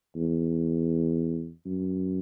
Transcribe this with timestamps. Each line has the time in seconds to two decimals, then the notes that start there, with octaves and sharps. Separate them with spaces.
0.16 E2
1.66 F#2